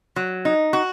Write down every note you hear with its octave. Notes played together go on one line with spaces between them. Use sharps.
F#3
D#4
F#4